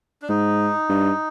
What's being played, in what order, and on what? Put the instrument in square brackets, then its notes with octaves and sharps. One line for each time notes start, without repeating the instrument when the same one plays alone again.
[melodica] D4
[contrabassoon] G#2 [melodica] D#4
[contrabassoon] G2